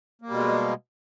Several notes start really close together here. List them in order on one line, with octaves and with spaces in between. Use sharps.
A#3 G3 B2 G#3